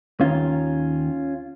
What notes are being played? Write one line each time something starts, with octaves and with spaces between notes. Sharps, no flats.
D#2 D#3 C#4 F4